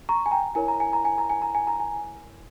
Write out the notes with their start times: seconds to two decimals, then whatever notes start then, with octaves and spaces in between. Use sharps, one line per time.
0.09 A#5 C#6
0.26 G#5
0.31 G5 A#5
0.55 E4 A#4 C#5 G#5
0.68 A#5
0.80 G#5
0.93 A#5
1.05 G#5
1.18 A#5
1.30 G#5
1.42 A#5
1.55 G#5
1.67 A#5
1.80 G#5